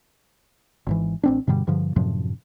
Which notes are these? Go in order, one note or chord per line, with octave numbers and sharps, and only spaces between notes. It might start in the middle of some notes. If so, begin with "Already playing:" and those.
G#1 G#2 E3
A1 C4 D4
G2 B2 D3 G3
G2 D3 F3
F#2 A2 C3 F3